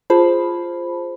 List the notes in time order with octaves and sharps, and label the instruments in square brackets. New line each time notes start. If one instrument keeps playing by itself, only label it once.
[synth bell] F4 G#4 C5 A5 B5